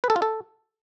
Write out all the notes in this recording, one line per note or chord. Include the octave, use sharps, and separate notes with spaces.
B4
A4
F4
A4